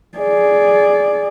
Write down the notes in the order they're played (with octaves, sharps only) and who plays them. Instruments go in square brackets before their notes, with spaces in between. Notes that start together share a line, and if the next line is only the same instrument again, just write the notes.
[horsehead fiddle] G#4 D5